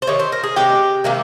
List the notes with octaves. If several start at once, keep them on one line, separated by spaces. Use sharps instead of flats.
C5
C3 D#3 C#5
C5
A#4
G#4
C3 D#3 G#3 G4
C3 D#3 G#3 A#3